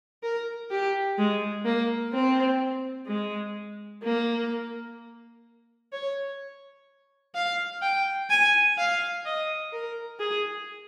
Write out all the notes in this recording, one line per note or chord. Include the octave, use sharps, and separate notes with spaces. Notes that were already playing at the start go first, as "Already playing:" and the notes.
A#4
G4
G#3
A#3
C4
G#3
A#3
C#5
F5
G5
G#5
F5
D#5
A#4
G#4